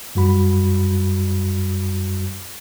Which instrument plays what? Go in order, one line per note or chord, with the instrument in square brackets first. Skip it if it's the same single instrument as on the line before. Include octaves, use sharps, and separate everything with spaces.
[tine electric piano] F#2 G3 F#4 B5